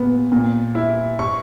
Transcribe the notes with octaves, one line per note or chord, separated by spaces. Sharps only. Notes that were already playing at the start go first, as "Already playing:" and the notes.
Already playing: A#2 B3
A#2
E4
C#6